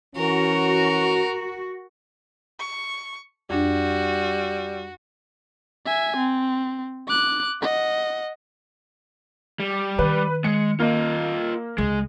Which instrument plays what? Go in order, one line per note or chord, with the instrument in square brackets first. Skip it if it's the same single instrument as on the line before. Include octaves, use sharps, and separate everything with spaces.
[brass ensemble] E3 C#4 [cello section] F#4 [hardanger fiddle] A#4
[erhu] C#6
[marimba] F2 D4 [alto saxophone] G3 [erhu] F#4
[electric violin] E5 G#5
C4
D6 F#6
D#5 F#5
[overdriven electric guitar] G3
[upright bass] D#3 [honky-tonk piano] B4
[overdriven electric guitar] G#3 [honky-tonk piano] C#7
[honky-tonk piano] A#3 [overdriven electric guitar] F4 D#5
[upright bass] C#2 [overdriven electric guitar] G#3